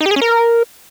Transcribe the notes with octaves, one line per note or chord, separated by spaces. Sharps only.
D#4
G4
G#4
C#4
A#4